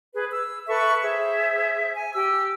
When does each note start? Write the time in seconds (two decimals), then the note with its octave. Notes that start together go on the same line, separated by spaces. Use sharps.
0.15 G#4 B4
0.31 E6
0.67 A4 B4 E5 C#6
1.02 G#4 C5 E5
1.95 G#5
2.14 G4 E6